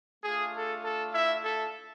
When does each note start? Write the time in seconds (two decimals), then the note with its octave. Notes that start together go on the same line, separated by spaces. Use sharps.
0.23 A3 D4 F4 G#4
0.54 A4
0.83 A4
1.13 E4 E5
1.44 A4